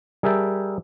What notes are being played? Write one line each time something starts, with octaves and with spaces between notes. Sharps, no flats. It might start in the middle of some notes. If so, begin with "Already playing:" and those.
G3 G#4 A#4 E5 G5 A5